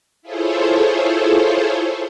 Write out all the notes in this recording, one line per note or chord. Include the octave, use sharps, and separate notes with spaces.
E4 F4 G#4 A4 C5 C#5